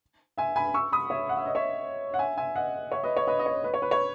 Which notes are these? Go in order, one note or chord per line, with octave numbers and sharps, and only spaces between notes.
E5 G#5
G#5 B5
C#6 E6
B5 D#6
C#5 E5
F#5
E5
D#5
C#5 E5
F#5
E5 G#5
E5 G#5
D#5 F#5
C#5 E5
B4 D#5
C#5
B4 D#5
D#5
C#5
B4
C#5
B4
C#5